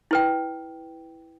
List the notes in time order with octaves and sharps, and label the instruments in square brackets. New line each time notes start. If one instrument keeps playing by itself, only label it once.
[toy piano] E4 B4 G5